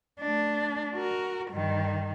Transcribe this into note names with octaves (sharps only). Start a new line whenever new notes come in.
A3 D4
F#4 A#4
G2 D#3